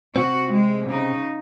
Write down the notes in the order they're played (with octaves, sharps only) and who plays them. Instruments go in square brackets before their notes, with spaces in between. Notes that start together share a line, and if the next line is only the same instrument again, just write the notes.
[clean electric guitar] C3 C4 [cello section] F#4
[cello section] G#3
C#3 D#4